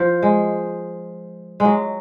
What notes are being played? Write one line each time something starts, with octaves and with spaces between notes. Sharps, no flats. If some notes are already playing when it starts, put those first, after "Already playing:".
Already playing: F3
G#3
F#3 G#3